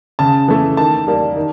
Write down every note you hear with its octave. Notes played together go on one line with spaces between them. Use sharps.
C#3 A5
E3 A3
D#3 A5
G3 A#3
D#3